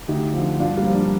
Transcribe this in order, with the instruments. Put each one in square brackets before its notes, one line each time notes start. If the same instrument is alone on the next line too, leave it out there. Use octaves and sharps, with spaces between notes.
[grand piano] D2 D#4 G4
D3 F3
G2 D4 F4
G3 A#3
F3
A#3 D4